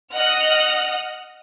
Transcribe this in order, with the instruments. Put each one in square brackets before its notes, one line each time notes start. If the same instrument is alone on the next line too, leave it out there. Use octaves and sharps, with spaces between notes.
[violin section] D#5 F#5 F6 F#6 A#6